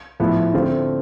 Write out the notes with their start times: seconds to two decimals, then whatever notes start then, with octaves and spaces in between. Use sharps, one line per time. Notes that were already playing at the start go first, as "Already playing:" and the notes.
0.20 A2 F3 B3 E4
0.54 D3 A3 C4 F4